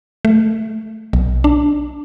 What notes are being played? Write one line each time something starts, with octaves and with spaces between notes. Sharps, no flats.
A3
B1
D4